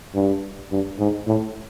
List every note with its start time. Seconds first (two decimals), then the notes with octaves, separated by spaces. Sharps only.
0.14 G2
0.71 G2
0.99 G#2
1.27 A2